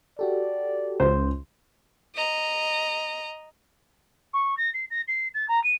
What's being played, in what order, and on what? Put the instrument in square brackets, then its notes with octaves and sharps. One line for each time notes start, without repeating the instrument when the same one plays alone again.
[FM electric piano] F#4 G4 A4 [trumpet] D5
[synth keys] C#2 [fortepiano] C5
[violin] D#5 A#5
[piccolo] C#6
A#6
C7
A#6
C7
A6
A#5
D#7